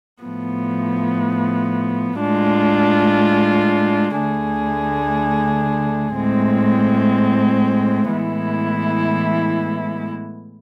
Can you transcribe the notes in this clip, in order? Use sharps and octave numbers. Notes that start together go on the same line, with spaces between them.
A2 F3 B3
A2 G#3 D4 F4
D2 D3 A3 D4 G#4
A2 G#3 C4
A2 E3 G#3 B3 E4